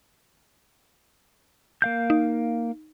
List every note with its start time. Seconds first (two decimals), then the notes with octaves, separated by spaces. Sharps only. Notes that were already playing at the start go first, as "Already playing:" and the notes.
1.82 A#3 F5 G6
2.10 D#4